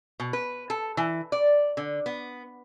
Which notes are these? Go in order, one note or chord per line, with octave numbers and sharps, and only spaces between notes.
B2
B4
A4
E3
D5
D3
B3